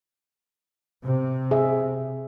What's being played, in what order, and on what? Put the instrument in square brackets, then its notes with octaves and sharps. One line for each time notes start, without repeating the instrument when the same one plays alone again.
[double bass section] C3
[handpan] G#4 E5